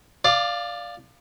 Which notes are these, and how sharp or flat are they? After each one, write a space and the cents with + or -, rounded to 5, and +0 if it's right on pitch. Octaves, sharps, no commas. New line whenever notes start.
D5 +0 F5 +0 D6 +35